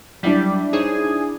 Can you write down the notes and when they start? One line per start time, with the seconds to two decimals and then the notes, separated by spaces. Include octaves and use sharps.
0.23 F#3 G3 D4 E4 B6
0.73 D#4 G#4 C5 C#5